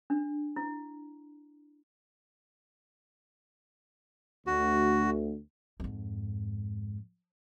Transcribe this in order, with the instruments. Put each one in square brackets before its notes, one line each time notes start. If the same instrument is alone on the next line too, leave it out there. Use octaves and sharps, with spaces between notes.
[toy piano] D4
E4
[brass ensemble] D2 [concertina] F#4
[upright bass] F2 G#2